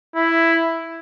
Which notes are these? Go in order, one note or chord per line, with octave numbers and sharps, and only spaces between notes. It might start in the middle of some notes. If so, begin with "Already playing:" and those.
E4